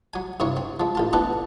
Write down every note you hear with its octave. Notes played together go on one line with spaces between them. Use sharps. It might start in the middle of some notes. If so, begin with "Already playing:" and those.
F#3 G#5
G2 C3 E4 C#5
C4
F3 G#3
A1 F4 A5
B3 C4 D4 E4 A4 B4